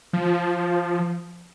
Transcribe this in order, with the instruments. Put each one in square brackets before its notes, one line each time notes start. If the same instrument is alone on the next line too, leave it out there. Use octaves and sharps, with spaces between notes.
[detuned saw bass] F3